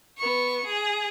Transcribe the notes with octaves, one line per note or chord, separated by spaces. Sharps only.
B3 C#6
G#4